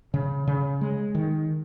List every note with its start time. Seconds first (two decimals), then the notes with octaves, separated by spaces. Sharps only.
0.14 C#3
0.47 C#3
0.81 G#3
1.15 D#3